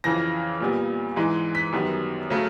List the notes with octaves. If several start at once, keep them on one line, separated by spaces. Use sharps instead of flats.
F2 C#3 E3 A#6
A#2 G3 B3
G#2 E3 G#3
B6
F#2 D#3 G3 B3
C#3 F#3 A3